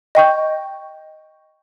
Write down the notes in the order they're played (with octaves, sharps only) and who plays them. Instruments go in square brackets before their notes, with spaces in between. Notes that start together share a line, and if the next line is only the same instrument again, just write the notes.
[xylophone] D#5 G5 C#6 G6